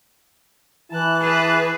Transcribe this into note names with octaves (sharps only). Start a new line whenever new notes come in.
E3 E4 A5 F#6
G#4 B4 A5 F#6